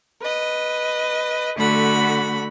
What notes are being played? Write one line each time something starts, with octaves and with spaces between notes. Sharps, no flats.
B4 D#5
D3 A3 F#4 F#5 B5